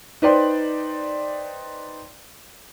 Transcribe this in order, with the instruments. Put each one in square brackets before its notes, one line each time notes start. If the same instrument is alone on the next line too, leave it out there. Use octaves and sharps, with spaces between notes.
[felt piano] D#4 B4 C5 D5 G5 C6